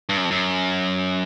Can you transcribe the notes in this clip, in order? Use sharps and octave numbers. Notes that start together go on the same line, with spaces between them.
G2
F#2
F2
F#2